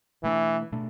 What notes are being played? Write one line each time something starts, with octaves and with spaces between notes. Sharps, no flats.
B2 E3 A3 D4
B2 A3 D4